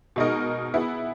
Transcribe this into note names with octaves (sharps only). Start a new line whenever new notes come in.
B2 G#3 D#4 A#4 D#5
B3 E4 G#4